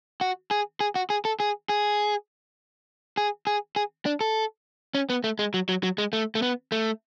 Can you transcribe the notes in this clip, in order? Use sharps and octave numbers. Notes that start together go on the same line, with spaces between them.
F#4
G#4
G#4
F#4
G#4
A4
G#4
G#4
G#4
G#4
G#4
D4
A4
C#4
B3
A3
G#3
F#3
F#3
F#3
G#3
A3
A3
B3
A3